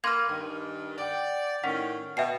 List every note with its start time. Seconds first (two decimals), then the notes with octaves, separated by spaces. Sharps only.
0.04 A#3 B4 C6 F6 G#6
0.29 G2 D#3 G#5
0.98 D5 F#5 G5
1.64 A2 D#3 C#4 F#5
2.17 B2 E5 G5 C7